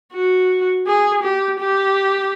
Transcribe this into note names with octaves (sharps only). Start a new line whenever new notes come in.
F#4
G#4
G4
G4